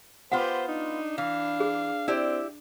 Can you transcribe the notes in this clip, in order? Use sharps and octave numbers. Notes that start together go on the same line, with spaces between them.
B3 F4 G4 B4 C5 F#5
D4 D#4
E3 F5
G#4
C4 E4 G4 D5